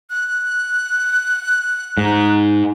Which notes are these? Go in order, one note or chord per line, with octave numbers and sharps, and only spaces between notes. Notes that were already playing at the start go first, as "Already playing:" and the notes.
F#6
G#2